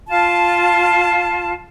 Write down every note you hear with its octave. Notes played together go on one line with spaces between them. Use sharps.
F4 A5